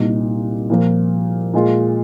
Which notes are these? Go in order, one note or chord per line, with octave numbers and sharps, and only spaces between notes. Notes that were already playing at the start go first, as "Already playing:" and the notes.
Already playing: C2 A#2 A#3 D#4
A#2 F3 A#3
A#2 G#3 F4